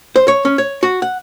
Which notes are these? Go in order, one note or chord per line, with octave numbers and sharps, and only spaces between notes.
C5
C#5
C#4
C#5
F#4
F#5